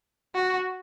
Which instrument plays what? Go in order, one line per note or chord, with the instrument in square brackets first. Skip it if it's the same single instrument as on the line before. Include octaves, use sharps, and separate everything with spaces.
[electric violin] F#4